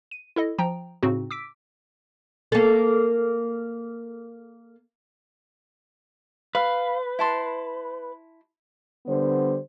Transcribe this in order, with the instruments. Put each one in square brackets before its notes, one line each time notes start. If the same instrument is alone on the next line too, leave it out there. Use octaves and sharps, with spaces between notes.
[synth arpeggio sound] D#7
E4 A4 D#5
F3 G5 A#5
A2 C#3 C4 D#4 F#4
D6 E6 B6 D7
[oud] A#3 A4
[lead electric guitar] B4 [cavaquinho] F5
[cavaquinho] E4 A5 C6
[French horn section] D3 G3 B3 C5